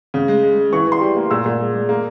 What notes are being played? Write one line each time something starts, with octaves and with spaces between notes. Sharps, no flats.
C#3
G#3
G#3
G#3
E3 C#6
E3 C6
G3
A#3
A#2 E6
A#2
G#3
G#3
A#3